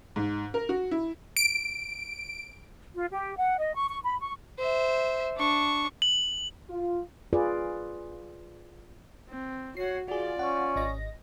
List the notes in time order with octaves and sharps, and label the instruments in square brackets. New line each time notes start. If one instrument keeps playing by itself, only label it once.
[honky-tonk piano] G#2
A#4
F#4
E4
[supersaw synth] D7
[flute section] F4
G4
F#5
D#5
C#6
C#6
B5
C#6
[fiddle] C5 E5
D4 C#6
[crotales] F#7
[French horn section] F4
[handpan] F4 G#4 B4 D5
[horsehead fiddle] C4
[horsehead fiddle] F#4 F#5 [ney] C#5 [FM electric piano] C7
[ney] F4 [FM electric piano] F#4 G#4 [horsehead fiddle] D5
[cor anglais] C#4 [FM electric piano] F#5
[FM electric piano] G#1 D#5 A#6